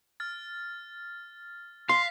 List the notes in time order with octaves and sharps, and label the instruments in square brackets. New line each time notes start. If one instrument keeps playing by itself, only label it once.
[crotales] F6 A6
[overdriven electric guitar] F5 [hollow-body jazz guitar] C6 [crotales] B6 C7